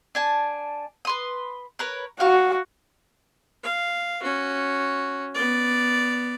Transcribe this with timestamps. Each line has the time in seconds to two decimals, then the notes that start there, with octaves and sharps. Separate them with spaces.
0.15 D4 G#5 A5
1.05 B4 C6 D#6
1.79 A#4 B4 C#5
2.20 F#4 F5 C#6
3.63 F5
4.23 C#4 F#4
5.35 B3 D5